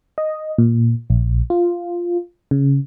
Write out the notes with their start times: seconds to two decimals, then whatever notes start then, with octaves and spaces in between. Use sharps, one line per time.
0.18 D#5
0.58 A#2
1.10 A#1
1.50 F4
2.51 C#3